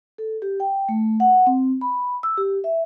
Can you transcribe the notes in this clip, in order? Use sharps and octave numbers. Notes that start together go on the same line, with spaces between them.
A4
G4
G5
A3
F#5
C4
B5
E6
G4
E5